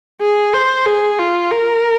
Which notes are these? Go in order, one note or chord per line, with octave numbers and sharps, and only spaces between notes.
G#4
C5
G#4
F4
A#4